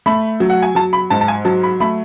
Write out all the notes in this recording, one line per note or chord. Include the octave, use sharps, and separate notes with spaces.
A3 B5
F#3
F#5
G#5
F#3 A5
B5
G#2 A5
A5
G#5
F#3 A5
B5
A3 B5